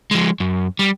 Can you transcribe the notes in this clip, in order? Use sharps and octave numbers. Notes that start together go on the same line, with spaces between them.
F3 G#3
F#2
G3